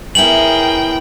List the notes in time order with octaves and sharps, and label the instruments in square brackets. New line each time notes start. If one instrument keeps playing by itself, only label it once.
[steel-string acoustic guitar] B3 C#4 E4 [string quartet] G#4 A#4 [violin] G5 [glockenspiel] F#7